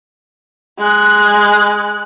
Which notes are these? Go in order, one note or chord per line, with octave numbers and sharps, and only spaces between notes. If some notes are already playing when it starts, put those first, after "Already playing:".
G#3 F#6